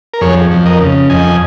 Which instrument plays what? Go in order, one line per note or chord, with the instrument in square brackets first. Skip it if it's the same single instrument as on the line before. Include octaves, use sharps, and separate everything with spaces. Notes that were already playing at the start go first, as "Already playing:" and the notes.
[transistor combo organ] A#4
F2 G#4 C#5
F2
A#4 D#5
C#3
F2 D#5 G#5